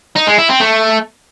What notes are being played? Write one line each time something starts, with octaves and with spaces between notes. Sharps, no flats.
D#4
G#3
E4
C4
A3